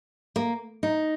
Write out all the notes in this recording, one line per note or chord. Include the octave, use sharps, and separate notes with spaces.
A#3
D#4